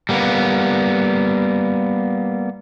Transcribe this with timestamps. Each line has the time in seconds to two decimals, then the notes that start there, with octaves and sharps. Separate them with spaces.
0.09 G3 A#3 B3